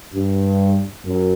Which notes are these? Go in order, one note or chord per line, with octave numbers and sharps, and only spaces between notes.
G2
F#2